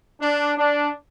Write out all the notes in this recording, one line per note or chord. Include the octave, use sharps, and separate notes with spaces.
D4
D4